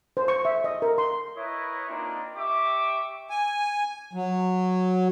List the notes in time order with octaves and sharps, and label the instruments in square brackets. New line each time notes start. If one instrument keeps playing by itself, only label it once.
[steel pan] C5
C#6
E5
D#5
A#4
C6
[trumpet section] E4 A#4 B4 C#5 D#5
A#3 C4 D4 D#4 F4
G4 E5 C#6 D6
[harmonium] G#5
F#3